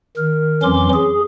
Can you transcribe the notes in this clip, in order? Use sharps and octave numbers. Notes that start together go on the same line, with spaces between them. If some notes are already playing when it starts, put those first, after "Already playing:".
D#3 A#4
F2 E3 F#3 C#4 C6 D6
G#4